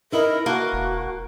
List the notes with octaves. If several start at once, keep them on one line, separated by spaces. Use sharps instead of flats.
D#4 E4 A#4 B4
A#3 F#4 A5
E1